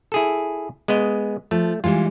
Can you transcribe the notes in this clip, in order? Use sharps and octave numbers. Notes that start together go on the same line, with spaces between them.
E4 G#4 A4
G#3 B3 D#5
F3 A3
E3 G3 G#3 F4